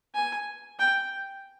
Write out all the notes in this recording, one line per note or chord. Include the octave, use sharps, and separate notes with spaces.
G#5
G5